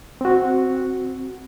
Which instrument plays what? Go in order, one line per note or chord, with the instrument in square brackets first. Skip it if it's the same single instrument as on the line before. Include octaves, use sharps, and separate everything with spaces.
[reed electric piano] C4 F#4